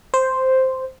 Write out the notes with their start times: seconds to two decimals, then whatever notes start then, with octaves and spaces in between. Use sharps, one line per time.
0.14 C5